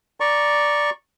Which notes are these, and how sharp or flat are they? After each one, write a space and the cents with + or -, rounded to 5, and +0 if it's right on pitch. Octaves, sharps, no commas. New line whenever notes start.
D5 +0 A#5 +10 C#6 -10